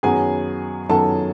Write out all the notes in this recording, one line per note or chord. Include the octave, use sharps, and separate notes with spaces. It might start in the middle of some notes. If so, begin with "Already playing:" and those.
F#2 D#3 F#3 B3 G#4 G#5
F#2 D#3 F#3 B3 A4 A5